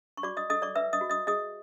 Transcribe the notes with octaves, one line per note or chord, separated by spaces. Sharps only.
C#6
F#4 D5 D6
D#5 D#6
A4 D#5 D#6
D5 D6
B4 E5 E6
D#5 D#6
F#4
D#5 D#6
G#4 D#5 D#6